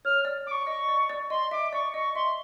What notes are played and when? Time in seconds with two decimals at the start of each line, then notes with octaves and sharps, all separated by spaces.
0.05 C#5 F6
0.25 D5
0.46 D5 C#6 D6
0.67 D#5
0.89 D5
1.09 D5
1.30 D#5 C6
1.51 E5 D6
1.73 D5 C#6
1.94 D#5 C#6
2.15 E5 C6